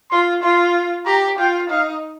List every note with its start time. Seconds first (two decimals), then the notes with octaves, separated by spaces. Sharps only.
0.11 F4 C6
0.43 F4 C6
1.06 G4 A#5
1.38 F4 G5
1.70 D#4 F5